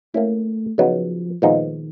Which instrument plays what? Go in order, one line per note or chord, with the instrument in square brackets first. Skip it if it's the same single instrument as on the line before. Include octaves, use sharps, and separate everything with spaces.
[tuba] A3 [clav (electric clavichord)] A#3 C#4 E4
[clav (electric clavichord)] C#3 F#3 B3 D#4 [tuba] F3
[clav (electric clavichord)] A#2 F3 G#3 B3 D#4 [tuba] D#3